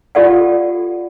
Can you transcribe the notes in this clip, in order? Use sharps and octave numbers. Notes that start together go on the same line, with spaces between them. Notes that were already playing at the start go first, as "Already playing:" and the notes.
F4 G4 A4 D5 F5 F#5